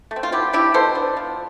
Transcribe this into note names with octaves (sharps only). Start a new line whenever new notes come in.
A3
C4
F4
D3 E4 G4
G3 D4 E4 G4
B2 A4 C5
B3 D4
F3